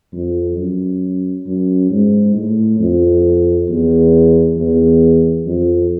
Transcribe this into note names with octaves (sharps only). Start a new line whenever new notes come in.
F2
F#2
F#2
G#2
A2
F2
E2
E2
F2